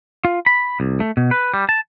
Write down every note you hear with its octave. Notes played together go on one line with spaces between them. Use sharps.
F4
B5
C2
A3
B2
B4
G3
A5